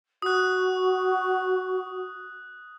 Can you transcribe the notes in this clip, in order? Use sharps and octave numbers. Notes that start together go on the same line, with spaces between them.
F#4 D#6 F#6